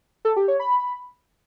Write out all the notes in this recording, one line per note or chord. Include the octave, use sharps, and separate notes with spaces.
A4
G4
C#5
B5